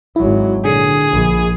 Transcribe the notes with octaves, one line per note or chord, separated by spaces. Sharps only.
G#1 F#3 E4
A#2 D3 G#4
A#1